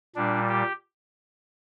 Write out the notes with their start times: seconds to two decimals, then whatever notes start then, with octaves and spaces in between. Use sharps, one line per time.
0.16 A#2 G3 D4
0.49 G4